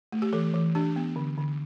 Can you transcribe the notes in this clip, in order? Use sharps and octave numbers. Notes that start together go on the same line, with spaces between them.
A3
G4
E3 A4
E3
D4 G4
B3
D3
D3